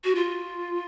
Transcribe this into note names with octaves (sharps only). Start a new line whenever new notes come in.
F#4
F4